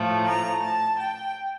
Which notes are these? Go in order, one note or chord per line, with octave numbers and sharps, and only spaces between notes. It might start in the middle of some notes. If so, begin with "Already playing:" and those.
Already playing: A2 F3 A3
A#5
A5
G5